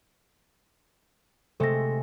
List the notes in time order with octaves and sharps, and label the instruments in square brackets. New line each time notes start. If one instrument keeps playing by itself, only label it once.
[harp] C3 G#3 A3 [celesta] A4 A#6